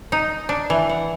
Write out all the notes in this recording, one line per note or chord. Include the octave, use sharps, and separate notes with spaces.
D#4
D4
E3
F#5